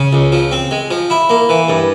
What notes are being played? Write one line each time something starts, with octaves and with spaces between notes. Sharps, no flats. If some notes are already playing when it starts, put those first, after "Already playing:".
Already playing: C#3
C#2
F3
C4
G#3
F3
E4
A#3
E3
G2